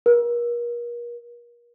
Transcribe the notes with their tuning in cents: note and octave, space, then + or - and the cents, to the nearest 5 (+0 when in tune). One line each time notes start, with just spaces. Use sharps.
A#4 +40